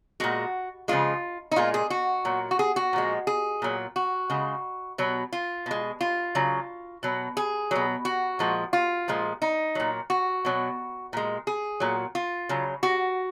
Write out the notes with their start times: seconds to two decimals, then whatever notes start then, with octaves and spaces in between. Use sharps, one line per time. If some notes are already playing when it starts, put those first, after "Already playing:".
0.20 A#2 G#3 F#4
0.88 C#3 F3 G#3 F4
1.51 D#4
1.56 A#2 G#3 F4
1.74 G#4
1.90 F#4
2.25 A#2 F#3
2.51 F#4
2.59 G#4
2.76 F#4
2.93 A#2 F3 G#3
3.27 G#4
3.62 A#2 F#3
3.96 F#4
4.30 C#3 G#3
4.98 B2 F#3
5.33 F4
5.66 B2 G#3
6.01 F4
6.35 C#3 F#3
7.03 B2 F#3
7.37 G#4
7.71 B2 F#3
8.05 F#4
8.39 A#2 F3 G#3
8.73 F4
9.08 A#2 F3 G#3
9.42 D#4
9.75 A#2 F#3
10.10 F#4
10.45 B2 F#3
11.13 A#2 G#3
11.47 G#4
11.80 A#2 F#3
12.15 F4
12.49 C#3 F#3
12.83 F#4